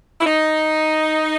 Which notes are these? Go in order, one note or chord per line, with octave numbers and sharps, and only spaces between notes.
E4
D#4